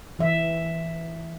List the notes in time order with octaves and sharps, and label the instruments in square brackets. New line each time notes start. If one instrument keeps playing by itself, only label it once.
[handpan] E3 E5